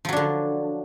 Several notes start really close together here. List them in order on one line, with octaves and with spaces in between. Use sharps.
F3 F#3 D4 D3